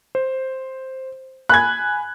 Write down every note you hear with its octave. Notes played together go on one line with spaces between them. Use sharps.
C5
G#5 B5 F#6 G#6